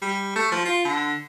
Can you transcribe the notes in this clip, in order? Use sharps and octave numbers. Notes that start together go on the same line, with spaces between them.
G3
A3
F3
F4
D3